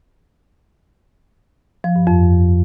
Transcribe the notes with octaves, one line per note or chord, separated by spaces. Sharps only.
F3
G2
F2